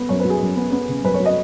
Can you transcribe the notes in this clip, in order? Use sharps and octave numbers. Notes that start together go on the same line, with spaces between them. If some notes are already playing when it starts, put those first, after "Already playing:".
Already playing: B3
F#2 C#5
B4
F#3
G#4
F#2
B3
B3
C#3
F#2 B4
C#5
F#3
D#5